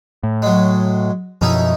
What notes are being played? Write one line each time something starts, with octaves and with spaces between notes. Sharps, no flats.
A2
F#3 G#3
F#2 B2 F3 C#4 D#4 E4